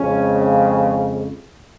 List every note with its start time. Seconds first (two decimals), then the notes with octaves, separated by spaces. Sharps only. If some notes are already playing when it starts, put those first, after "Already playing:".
Already playing: F2 C#3 G#3 C#4